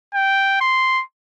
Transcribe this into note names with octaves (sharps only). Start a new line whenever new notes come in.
G5
C6